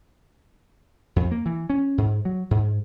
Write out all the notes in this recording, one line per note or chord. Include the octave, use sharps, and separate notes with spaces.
F2
A#3
E3
C#4
G#2
F#3
G#2